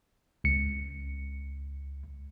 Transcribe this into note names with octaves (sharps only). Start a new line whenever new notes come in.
C#2 C#7